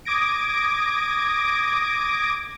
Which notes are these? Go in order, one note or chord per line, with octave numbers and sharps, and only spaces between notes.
D6 D#6 G#6 A#6 D7